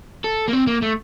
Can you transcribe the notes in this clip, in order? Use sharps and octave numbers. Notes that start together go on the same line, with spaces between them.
A4
A#3
C4
A#3
A3